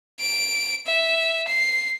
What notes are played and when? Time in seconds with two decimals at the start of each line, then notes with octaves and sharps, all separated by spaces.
0.20 D7
0.86 E5
1.48 C7